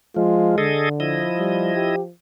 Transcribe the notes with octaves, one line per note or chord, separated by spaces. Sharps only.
F3 G#3 F4
D3 G#4 A4 D#5
F3 E4 D#5
G3
G4